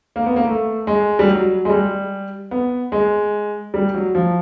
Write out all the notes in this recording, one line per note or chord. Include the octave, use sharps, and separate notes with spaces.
A#3
B3
A#3
A3
G#3
G3
F#3
G#3
G3
B3
G#3
G3
F#3
F3